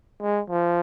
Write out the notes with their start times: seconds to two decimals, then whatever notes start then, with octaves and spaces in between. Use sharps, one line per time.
0.21 G#3
0.50 F3